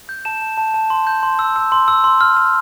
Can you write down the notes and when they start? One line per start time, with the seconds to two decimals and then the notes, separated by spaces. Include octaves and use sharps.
0.09 G6
0.25 A5 E7
0.42 A5
0.58 A5
0.74 A5
0.90 C6
1.07 G6
1.23 C6
1.39 E6
1.56 E6
1.72 C6
1.88 E6
2.04 C6
2.21 F6
2.37 F6